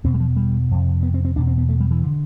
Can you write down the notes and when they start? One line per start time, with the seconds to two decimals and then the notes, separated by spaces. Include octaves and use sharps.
0.04 E2 B2 C4
0.14 G3
0.20 F3
0.37 G3
0.71 F2 C3
1.03 B3
1.14 C4
1.25 C4
1.36 E2 B2 D4
1.47 C4
1.58 B3
1.69 A3
1.80 G3
1.91 E3
2.06 D3